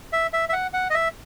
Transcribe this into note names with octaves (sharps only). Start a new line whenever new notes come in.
E5
E5
E5
F#5
F#5
D#5
E5